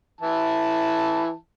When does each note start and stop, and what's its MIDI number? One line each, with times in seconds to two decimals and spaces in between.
0.21 1.35 52
0.21 1.35 64
0.21 1.35 81